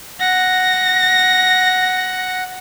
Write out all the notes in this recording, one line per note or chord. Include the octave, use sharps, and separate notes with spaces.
F#5 A#6